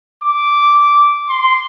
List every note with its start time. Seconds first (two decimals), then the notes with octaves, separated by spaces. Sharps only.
0.23 D6
1.29 C6